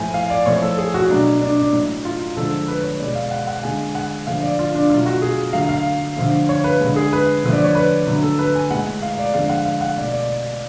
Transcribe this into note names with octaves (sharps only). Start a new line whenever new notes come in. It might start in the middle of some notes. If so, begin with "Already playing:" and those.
Already playing: A2 F3 A3 G#5
F5
D5
A2 F3 A3 C#5
A4
G#4
F#4
B2 F#3 A3 D4
D4
D4
A2 F#3 A3
F4
D3 F3 G#3 A4
B4
C#5
B2 G#3 D5
F5
F#5
F#5
D3 G#3 G#5
F#5
D3 F3 A3 F5
D5
F4
D4
B2 F#3 A3 F4
F#4
G#4
D3 F#3 A3 F5
F5
D3 F3 A3
C#5
B4
D3 G#3
G#4
B4
D3 F3 A3
D5
C#5
B4
D3 F#3 A3
A4
B4
G#5
A2 G#3 F#5
F5
D5
D3 F3 G#3 F5
F#5
F5
F#5
B2 A3 D5
D5